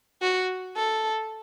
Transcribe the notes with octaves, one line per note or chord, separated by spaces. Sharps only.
F#4
A4